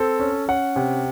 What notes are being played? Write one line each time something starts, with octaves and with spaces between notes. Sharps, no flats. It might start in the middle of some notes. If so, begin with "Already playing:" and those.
Already playing: C4 A4
C#4
C#4 F#5
C3